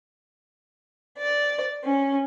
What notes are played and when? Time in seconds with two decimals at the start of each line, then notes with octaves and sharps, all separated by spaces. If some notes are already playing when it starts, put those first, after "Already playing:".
1.18 D5
1.83 C#4